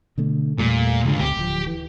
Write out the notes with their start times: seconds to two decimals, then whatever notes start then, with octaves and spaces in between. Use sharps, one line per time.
0.18 B2 D3 A3
0.58 E2 A#2 G3 A3
1.05 C#2 G#2 D3
1.20 C#2 G4
1.37 D1 F3
1.67 E3